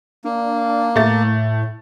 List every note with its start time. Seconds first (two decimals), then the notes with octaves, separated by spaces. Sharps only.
0.24 A#3 D4
0.96 A2 A3 A6